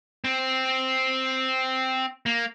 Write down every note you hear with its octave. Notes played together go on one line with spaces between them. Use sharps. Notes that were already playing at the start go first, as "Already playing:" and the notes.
C4
A#3